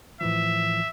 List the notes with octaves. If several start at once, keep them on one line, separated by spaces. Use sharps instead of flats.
A2 E3 F3 E5